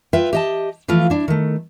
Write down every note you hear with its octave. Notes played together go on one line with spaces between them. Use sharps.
F4 B4 E5 G5
G4 D#5 A5
E3 F3 A3 F4
D4 E4
D#3 A3